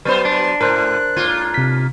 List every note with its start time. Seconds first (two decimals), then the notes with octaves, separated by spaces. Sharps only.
0.05 F#3 B3 B4 C5
0.25 D4 C6
0.61 A2 A3 A#4 C5 F#6
1.16 G#2 A#3 F4
1.54 C3 B6